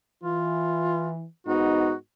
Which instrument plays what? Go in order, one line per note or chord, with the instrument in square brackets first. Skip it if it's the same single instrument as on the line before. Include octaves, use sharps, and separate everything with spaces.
[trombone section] E3 [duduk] F4
[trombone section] G#2 B3 D#4 [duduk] F#4